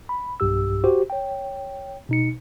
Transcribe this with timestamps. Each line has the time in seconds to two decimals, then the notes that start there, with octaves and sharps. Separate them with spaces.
0.09 B5
0.40 B1 G2 G4 E6
0.84 F#4 G4 C5
1.10 C#5 G5
2.09 B2 D#4 C#7